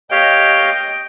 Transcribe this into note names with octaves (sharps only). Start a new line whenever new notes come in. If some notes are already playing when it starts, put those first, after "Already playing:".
G4 C#5 D#5 F5 G5